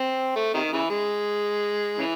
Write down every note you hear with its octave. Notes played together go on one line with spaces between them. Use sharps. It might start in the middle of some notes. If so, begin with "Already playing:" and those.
Already playing: C4
A3
C3 D#3
C#3 E3
G#3
C#3 E3